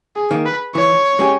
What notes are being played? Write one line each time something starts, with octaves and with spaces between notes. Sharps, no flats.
G#4
D#3 A#3
B4
E3 C#5
G#3 C#4 G4